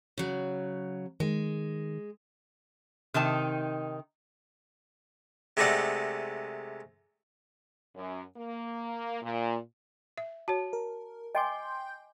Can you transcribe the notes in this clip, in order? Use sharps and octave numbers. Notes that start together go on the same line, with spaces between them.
C#3 F#3
D#3 G#3
C3 D#3 D#4 A5
C3 G#3 A3 D#4 D5 F#5
F#2
A#3
A#2
E5
F#4 C#5 A5
A#4
D#5 G5 G#5 C6 D6 G6